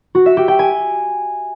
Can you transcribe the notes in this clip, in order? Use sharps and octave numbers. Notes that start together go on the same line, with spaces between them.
F#4
E5
G4
G5
G#5